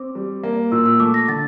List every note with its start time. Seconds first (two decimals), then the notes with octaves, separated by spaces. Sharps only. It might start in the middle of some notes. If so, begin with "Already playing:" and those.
Already playing: C4 D6
0.15 G3
0.43 A#3
0.72 A#2 E6
0.86 E6
1.00 A3 D6
1.14 A#6
1.28 D3 A6